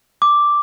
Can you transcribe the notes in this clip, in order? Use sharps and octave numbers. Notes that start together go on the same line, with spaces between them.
D6